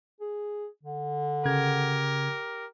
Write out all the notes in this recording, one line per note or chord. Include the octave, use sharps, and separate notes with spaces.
G#4
D3
C#3 G4 A#4 G#6